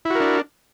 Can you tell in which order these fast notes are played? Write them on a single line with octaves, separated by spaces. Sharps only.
E4 F#4 A#4 D4